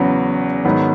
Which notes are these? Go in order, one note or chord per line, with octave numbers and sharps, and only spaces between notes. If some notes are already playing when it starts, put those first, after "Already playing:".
Already playing: E2 C#3 F#3 B3
G#2 D#3 F#3 B3